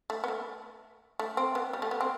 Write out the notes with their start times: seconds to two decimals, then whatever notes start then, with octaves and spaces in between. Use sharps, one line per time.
0.10 A3
0.24 B3
0.28 A3
1.19 A3
1.37 C4
1.55 B3
1.73 G3
1.82 A3
1.91 B3
2.01 C4